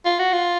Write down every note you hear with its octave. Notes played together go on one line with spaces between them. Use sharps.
F4
F#4
F4